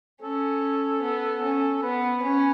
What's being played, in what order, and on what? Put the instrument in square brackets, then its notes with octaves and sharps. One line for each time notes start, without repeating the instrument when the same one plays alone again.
[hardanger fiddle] C#4 [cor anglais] A4
[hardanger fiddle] B3
C#4
[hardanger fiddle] B3 [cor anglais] B4
[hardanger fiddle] C#4